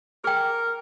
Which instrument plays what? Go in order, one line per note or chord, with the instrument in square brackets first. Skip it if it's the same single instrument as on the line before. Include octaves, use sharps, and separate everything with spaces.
[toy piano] G#4 G5 [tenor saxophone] A#4